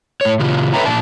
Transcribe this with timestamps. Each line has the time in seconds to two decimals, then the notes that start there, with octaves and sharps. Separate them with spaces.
0.21 A2 C#5
0.40 A#2 C#3 F4
0.74 A4 B4 C#5 E5 G5 A#5
0.86 A#2 D5 A5